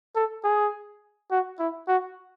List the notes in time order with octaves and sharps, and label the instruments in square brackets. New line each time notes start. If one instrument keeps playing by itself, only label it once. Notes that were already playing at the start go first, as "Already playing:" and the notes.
[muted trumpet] A4
G#4
F#4
E4
F#4